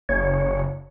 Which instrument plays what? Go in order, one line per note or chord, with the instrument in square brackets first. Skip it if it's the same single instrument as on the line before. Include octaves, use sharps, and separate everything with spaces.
[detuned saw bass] F#1 [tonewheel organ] C#5